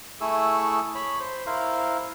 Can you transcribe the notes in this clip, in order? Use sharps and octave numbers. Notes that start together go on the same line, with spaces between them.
A3 E4 G#4 C#6 D#6 E6
C#5 B5
C5
E4 A#4 C5 F5